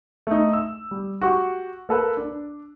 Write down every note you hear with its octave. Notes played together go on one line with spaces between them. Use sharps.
A3 D#4
E6
G3
F#4 G4 C#6
A#3 A4 B4
D4